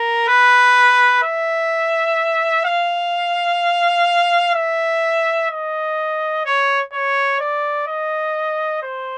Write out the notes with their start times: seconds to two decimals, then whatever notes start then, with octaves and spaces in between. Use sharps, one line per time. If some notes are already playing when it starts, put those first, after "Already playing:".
Already playing: A#4
0.28 B4
1.23 E5
2.65 F5
4.55 E5
5.50 D#5
6.46 C#5
6.93 C#5
7.40 D5
7.87 D#5
8.82 C5